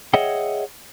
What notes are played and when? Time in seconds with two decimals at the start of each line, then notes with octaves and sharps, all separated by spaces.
0.14 G#4 C#5 D#5 E5 F#5 G5